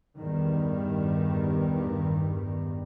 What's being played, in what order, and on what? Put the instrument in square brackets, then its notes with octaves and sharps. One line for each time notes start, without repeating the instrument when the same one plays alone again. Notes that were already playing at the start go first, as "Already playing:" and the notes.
[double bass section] A1 E2 G2 D#3 G3